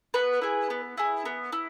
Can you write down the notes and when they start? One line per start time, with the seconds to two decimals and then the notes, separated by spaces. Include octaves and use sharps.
0.14 B3 B4
0.42 E4 G#4
0.70 B3
0.97 E4 G#4
1.25 B3
1.52 E4